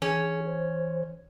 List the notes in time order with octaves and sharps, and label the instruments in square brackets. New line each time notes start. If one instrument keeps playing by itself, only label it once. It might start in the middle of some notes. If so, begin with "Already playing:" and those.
[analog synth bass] E3 [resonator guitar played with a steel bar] C#4 [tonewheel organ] G#4
[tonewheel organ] C5